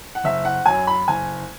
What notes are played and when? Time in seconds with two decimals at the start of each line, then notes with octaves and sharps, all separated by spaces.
0.15 F#5
0.24 F#1 E5
0.45 F#5
0.66 F#2 F#3 G#5
0.87 B5
1.08 F#1 G#5